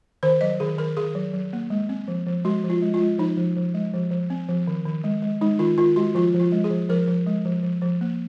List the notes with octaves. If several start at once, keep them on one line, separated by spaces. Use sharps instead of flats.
D#3 C5
F#3 D#5
D#3 G#4
D#3 A#4
D#3 G#4
F#3
F#3
A#3
G#3
C4
F3
F3
G#3 F#4
F3
F4
G#3
F4
G#3
F3 D#4
F3
F3
G#3
F3
F3
C4
F3
D#3
D#3
G#3
G#3
G#3 D#4
D#3 F4
D#3 F4
G#3 F#4
F3 F4
F3
F4
G#3
G#4
F3
F3 A#4
F3
G#3
F3
F3
F3
A#3